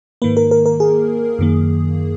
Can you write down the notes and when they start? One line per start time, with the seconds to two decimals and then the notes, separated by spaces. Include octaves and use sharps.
0.22 G#2 D#3 A#3 B4
0.37 A#4
0.51 A#4
0.66 A#4
0.80 G#4
1.39 F#2 D#3 A#3